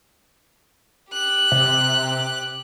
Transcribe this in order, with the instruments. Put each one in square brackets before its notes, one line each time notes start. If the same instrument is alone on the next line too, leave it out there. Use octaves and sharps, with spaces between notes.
[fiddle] G4 F#6
[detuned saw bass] C3